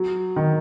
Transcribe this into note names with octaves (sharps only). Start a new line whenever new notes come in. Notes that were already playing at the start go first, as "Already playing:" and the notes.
Already playing: F#3
D#3